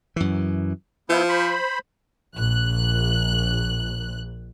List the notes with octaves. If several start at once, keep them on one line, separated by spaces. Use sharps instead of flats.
F#2 E3
F3 B3 E4 G6
C5 B5
A#1 F#6